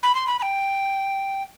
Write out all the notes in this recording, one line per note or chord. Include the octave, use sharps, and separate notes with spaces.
B5
C6
B5
B5
G5